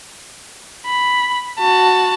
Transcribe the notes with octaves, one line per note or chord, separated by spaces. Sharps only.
B5
F#4 A5